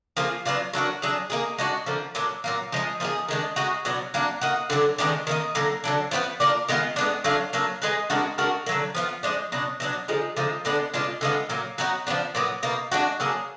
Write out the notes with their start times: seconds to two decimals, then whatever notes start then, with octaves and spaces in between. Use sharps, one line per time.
0.17 F3 A#3 F4 G#4
0.45 F#3 B3 D4 F4
0.73 F#3 D4 F#4 A#4
1.02 F#3 D4 G#4
1.30 A#3 D#4 G#4
1.58 G#3 D4 F#4
1.86 D3 F3 A#3
2.15 A#2 F#3 D4
2.44 A#2 F#3 A#3
2.72 F3 G#3 D#4
3.00 F3 A#3 D#4 G#4
3.28 D#3 G#3 D4
3.56 G#3 D#4 F#4
3.85 B2 F#3 D4
4.14 F#3 A#3 D4
4.41 A#3 D#4 F#4
4.70 D3 F#3 D4
4.98 D#3 G#3 B3 D4
5.27 D#3 A#3 D#4
5.55 D3 F#3 A#3
5.84 D3 F#3 D4
6.11 F3 B3 F4 B4
6.40 A#3 D4 F4 A#4
6.68 D#3 G#3 B3 F4
6.96 G#3 B3 D4
7.24 D3 F#3 D4 F4
7.53 F#3 A#3 D4
7.82 G#3 D#4 G#4 B4
8.10 G#3 D4 F#4 A#4
8.38 G#3 D4 F#4 A#4
8.66 D3 F#3 A#3
8.95 F3 B3 F4
9.23 F3 G#3 D4
9.52 B2 F#3 D4
9.80 B2 F#3 D4
10.08 D3 F3 G#3 D#4
10.37 D3 F3 G#3 D#4
10.65 D3 G#3 B3 D4
10.94 B2 G#3 D4 F4
11.21 D3 G#3 B3 F4
11.49 A#2 F#3 A#3
11.78 F#3 B3 D#4 F#4
12.07 F3 B3 D4
12.35 A#2 F#3 B3
12.63 B2 A#3 D#4
12.92 G#3 D4 F#4
13.20 F#3 A#3 D4 G#4